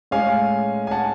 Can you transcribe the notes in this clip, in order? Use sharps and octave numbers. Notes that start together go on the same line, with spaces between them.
A2 G#3 C#4 F5 G#5
G#5
F#5 A5